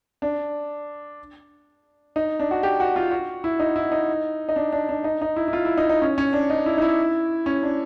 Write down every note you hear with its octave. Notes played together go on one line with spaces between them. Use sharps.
D4
D#4
D4
F#4
G4
F#4
F4
F#4
E4
D#4
E4
D#4
D#4
D4
D4
D4
D#4
D#4
E4
E4
F4
E4
D#4
D#4
C#4
C#4
D4
D#4
E4
D#4
E4
C#4
D4